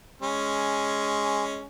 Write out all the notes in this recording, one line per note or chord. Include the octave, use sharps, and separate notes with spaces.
G#3 C#4